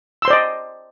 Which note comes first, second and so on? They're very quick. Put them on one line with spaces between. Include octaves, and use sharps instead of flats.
E6 C6 C5 D5 D#5